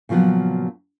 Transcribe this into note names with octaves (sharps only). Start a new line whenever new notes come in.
A#2 C#3 F3 F#3 B3